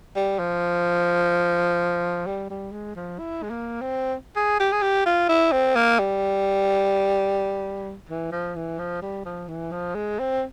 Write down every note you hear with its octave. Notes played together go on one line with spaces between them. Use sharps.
G3
F3
G3
G3
G#3
F3
E4
G#3
A#3
C4
G#4
G4
G#4
G4
F4
E4
C4
A#3
G3
E3
F3
E3
F3
G3
F3
E3
F3
G#3
C4